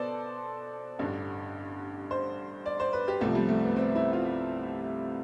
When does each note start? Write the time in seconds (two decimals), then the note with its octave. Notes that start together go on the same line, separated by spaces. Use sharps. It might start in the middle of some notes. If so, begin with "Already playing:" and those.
Already playing: B2 B3 A4 C5 D5
0.99 A1 G2 D3
2.11 C5
2.66 D5
2.80 C5
2.93 B4
3.08 G4
3.21 C2 C3 F3 A3
3.35 G3
3.49 A3
3.63 B3
3.76 C4
3.95 E4
4.13 F4